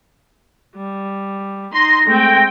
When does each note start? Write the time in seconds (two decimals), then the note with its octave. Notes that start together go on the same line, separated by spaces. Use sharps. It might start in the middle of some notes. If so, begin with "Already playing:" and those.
0.76 G3
1.74 D#4 C6 A#6
2.07 G#3 A3 C4 G5